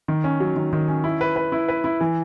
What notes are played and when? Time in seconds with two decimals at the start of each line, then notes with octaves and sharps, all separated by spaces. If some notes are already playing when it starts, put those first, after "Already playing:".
0.08 D#3
0.24 C#4
0.40 F#3
0.56 D#3
0.73 D#3
0.88 C#4
1.04 E4
1.21 B4
1.36 B4
1.52 E4
1.68 B4
1.84 E4
2.01 E3